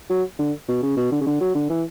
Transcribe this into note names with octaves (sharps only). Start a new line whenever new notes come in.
F#3
D3
B2
C#3
B2
D3
C#3
D3
F#3
D3
E3